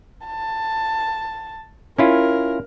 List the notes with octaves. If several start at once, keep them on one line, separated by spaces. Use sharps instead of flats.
A5
C#4 E4 F4 A#4